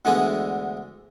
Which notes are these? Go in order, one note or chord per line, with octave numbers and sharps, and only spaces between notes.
D2 D3 E3 G#3 B3 G#5